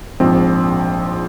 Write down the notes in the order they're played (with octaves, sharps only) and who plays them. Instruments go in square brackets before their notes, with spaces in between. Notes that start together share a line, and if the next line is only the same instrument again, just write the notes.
[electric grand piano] A#1 G#2 F3 C4